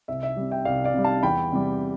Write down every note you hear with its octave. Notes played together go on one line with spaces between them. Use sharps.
C2 E5
E5
C3 G3
E5 G5
C2 D5 F5
D5 F5
C3 G3
F5 A5
E2 G5 B5
C3 G3